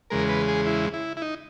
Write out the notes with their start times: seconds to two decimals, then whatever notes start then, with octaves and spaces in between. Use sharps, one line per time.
0.10 E2 C#3 G#3 A#4
0.29 B4
0.48 G#4
0.66 E4
0.93 E4
1.17 E4
1.22 D#4